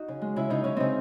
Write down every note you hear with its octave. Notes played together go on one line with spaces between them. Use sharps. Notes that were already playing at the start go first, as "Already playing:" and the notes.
Already playing: D#4 F#4
C#3
G#3
C#3 E4
C#3 D#4
C#3 C#4
C#3 C4 D#4